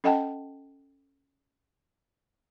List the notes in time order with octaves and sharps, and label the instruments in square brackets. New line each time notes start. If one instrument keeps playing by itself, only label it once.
[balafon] C#4 A4 D#5 F#5 G5 A5